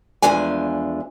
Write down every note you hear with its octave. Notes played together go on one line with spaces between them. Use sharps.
E2 F3 G#3 A3 D4 G#5